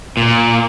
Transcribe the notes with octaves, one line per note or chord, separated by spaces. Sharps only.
A#2